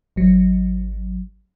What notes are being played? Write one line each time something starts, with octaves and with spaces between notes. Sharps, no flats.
G#1 F#3